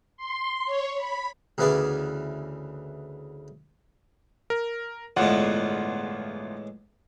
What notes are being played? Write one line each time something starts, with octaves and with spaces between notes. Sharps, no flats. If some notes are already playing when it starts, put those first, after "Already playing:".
C6
C#5
B5
D2 C#3 E3 B3 G#4 D5
A#4
G1 E2 A2 G#3 F4 F#5